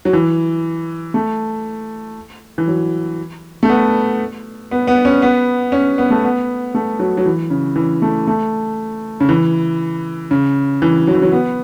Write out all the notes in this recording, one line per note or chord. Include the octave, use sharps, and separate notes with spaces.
F#3
E3
A3
E3
F#3
A3
B3
B3
B3
C#4
B3
C#4
B3
A3
B3
A3
F#3
F#3
E3
C#3
E3
A3
A3
C#3
E3
C#3
E3
F#3
E3
F#3
B3